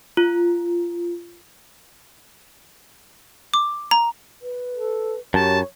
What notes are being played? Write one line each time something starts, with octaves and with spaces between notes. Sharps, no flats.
F4
D6
A#5
B4
A4
F#2 G4 C#5 A5